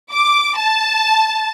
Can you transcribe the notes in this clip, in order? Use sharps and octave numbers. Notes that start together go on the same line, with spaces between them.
D6
A5